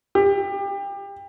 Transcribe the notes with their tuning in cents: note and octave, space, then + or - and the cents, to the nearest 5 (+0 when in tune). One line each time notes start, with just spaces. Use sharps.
G4 +30